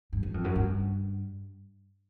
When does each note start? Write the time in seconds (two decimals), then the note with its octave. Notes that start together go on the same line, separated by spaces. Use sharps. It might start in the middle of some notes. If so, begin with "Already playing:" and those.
0.13 G2
0.23 F#2
0.34 F2
0.44 F#2
0.56 G2